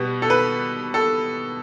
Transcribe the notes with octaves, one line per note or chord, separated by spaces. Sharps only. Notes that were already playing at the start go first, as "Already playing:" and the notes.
Already playing: B2 G3 B3
A4
B4
A4